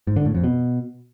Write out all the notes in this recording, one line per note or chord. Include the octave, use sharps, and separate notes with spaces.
G#2
D3
A2
F2
B2